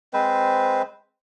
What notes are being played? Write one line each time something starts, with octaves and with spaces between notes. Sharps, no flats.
G#3 C4 B4 C5